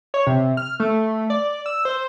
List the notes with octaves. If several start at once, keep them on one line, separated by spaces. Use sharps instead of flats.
C#5
C3
F6
A3
D5
E6
C5